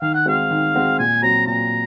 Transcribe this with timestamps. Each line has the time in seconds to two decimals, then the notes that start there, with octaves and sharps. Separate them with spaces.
0.02 D#3 F5
0.15 F#5
0.26 G#3 C4 F#4 F5
0.51 D#3
0.74 G#3 C4 F#4
0.99 A#2 G#5
1.22 F#3 C4 A#5
1.47 A#2 A#5